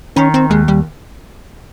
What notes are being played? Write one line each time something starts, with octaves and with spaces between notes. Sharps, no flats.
D#3 C#4
C4
D#2 G#3
G3